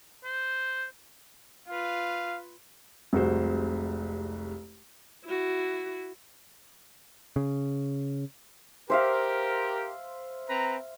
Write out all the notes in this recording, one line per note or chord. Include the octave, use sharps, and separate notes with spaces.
C5
F4 B4 F5
F1 C2 G#3 F#4 C5
E4 F#4
C#3
G4 A#4 C5 E5 F5
C4 B4 A#5